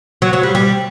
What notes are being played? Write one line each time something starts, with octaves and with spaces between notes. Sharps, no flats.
F#3
F#3
G3
G3